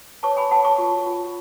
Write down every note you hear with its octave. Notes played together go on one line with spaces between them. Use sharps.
C#5 A5 C#6
G#5 B5
C#5 F#5 A5
A5 C#6
F4
F4